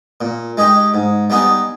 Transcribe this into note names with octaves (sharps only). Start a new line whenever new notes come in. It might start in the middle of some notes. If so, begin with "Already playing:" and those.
A#2
G#3 D#4 G4
G#2
G3 B3 D#4 G#4